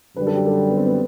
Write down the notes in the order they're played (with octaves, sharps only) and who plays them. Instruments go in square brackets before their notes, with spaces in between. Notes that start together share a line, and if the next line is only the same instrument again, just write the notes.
[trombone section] F#2 D3 G3 [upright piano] B4
[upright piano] A4
G4
A4
B3
C4
B3